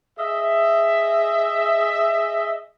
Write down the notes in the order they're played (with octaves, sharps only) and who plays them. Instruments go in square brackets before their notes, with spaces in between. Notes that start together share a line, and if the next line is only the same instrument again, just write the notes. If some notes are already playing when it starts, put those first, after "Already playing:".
[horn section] G#4 D#5 E5